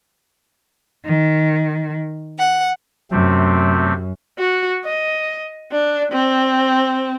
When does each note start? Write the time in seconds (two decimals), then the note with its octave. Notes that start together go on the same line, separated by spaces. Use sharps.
1.04 D#3
2.38 F#5
3.11 F#2 C3 A3 C4
4.39 F#4
4.85 D#5
5.72 D4
6.12 C4